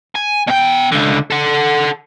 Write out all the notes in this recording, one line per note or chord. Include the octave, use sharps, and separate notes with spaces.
G#5
B2 G5
C#2 D3
A4 F#5